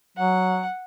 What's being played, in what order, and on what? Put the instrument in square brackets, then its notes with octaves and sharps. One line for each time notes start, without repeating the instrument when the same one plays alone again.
[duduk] F#3 [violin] F#5